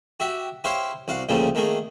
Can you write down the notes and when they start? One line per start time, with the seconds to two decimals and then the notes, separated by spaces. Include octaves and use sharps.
0.20 F#4 G4 E5
0.64 E4 G4 C5 C#5 F5
1.08 C2 F#4 F5
1.29 D2 A#2 C#3 F3 G3 A3
1.55 D#3 A3 A#3 G#4